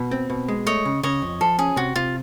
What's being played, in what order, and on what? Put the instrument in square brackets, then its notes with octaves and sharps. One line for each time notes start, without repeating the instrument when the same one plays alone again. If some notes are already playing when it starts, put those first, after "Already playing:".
Already playing: [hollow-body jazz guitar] B2
C4
B2
G#3
[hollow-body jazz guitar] A3 [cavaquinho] C#5 D#5
[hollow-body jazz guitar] C#3
[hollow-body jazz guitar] C#3 [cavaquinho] C#5 D#5
[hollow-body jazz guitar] F2
[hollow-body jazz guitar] F3 [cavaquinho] A4
[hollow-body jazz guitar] C#4 [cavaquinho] G#4
[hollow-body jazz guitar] C3 [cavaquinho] F#4
[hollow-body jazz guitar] C3 [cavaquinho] F4